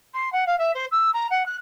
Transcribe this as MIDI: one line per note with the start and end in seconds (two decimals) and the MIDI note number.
0.14 0.32 84
0.33 0.45 78
0.47 0.58 77
0.59 0.71 76
0.75 0.86 72
0.91 1.10 88
1.13 1.27 82
1.31 1.46 78
1.46 1.57 90